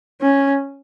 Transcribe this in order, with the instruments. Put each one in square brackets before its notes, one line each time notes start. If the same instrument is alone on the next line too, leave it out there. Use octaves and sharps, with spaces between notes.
[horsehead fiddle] C#4